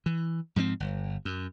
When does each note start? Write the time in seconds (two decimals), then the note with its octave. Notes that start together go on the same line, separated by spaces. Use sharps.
0.06 E3
0.56 G#2 F3 G3 C4
0.80 G1
1.25 F#2